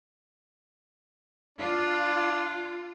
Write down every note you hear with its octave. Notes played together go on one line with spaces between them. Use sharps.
D4 F4